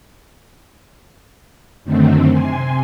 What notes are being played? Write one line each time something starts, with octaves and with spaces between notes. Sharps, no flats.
F#2 D3 D#3 A3 C4
C3 G#5 C6